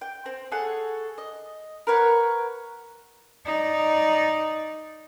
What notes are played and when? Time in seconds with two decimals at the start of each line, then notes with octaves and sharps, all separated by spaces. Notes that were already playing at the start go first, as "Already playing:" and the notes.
0.01 G5
0.26 C4
0.52 G#4 A4 C#5 F#5
1.18 D#5
1.87 A#4 B4 C#5 F#5
3.45 D#4 D5